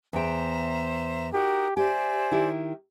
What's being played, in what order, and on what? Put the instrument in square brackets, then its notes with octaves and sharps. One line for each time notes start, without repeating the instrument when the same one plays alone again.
[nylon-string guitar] E2 G5 [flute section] C5 E5 A#5
[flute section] D#4 F#4 A#4 [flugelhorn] G4
[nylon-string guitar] G4 [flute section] C5 D5 E5 [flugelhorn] G#5
[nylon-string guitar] D#3 E4 G4